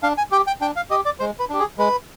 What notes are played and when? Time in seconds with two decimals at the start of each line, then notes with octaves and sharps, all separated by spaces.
0.03 D4 F5
0.18 G#5
0.31 G4 G5
0.47 G5
0.61 D4 G5
0.76 F5
0.90 G4 D#5
1.05 D5
1.20 G#3 C5
1.39 B4
1.49 D4 G4
1.59 G#4
1.78 G#3 B4